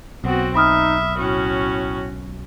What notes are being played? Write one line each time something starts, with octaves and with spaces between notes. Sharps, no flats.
B1 B3 C4 F#4
D#4 E5 B5 D#6 F6
A2 C#4 F#4